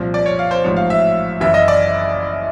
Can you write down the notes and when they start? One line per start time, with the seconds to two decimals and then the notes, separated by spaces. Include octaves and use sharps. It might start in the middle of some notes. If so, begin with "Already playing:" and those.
Already playing: C2 A#2 F3
0.14 D5
0.26 C#5
0.39 F5
0.51 C5
0.64 A1 G#2 F3 C#5
0.76 F5
0.90 E5
1.40 F#1 F#2 C#3 E3 E5
1.54 D#5
1.68 D5